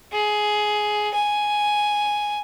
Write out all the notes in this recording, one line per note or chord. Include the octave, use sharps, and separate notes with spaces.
G#4
G#5